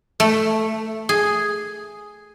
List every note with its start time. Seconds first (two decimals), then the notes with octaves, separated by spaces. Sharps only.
0.20 A3
1.09 G#4